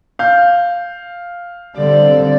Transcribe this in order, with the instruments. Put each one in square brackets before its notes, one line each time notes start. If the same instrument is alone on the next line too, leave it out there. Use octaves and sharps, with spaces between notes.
[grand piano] F5 G6
[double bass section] D3 G3 C4 [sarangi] D5